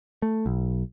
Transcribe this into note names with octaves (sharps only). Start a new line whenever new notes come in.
A3
B1